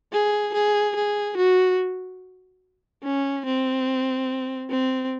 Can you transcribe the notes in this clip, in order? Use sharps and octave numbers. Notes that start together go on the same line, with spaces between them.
G#4
G#4
G#4
F#4
C#4
C4
C4